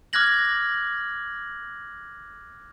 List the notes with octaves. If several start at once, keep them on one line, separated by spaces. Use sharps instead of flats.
D6 F6 F#6 G#6 A#6 F#7